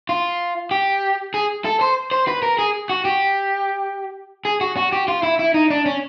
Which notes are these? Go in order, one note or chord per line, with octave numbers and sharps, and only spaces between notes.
F4
G4
G#4
A4
C5
C5
B4
A#4
G#4
F#4
G4
G#4
F#4
F#4
G4
F4
E4
E4
D#4
D4
C#4